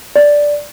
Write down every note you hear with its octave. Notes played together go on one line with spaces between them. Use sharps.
D5